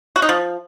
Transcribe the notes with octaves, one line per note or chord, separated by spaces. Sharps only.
F#4
D#4
F3